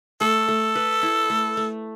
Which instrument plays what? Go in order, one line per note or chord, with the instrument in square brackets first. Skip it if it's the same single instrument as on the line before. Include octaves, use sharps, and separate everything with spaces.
[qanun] A3 [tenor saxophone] A4
[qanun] A3
B4
E4
A3
A3